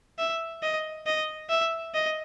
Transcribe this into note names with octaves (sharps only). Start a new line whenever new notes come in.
E5
D#5
D#5
E5
D#5